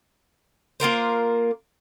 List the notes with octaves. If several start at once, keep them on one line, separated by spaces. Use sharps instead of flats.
A#3 F4 A#4 C5